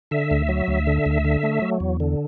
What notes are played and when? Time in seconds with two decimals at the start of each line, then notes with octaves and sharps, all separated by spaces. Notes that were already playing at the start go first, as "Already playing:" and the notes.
0.11 D3 E5
0.31 D2
0.49 F#3
0.68 D2
0.87 D3
1.06 D2
1.24 D3
1.43 A3
1.62 F#3
1.80 E2
2.00 D3